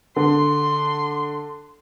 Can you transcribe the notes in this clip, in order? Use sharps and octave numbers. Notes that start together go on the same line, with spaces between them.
D3 C6